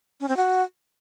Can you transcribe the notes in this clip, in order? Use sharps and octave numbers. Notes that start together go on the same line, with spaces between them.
C#4
C4
F#4